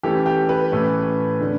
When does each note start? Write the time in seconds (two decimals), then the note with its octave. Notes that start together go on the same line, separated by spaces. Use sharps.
0.03 E3 A3 C#4 G4
0.26 G4
0.49 B4
0.72 A2 E3 A3 C#4
1.41 D3 A3 C#4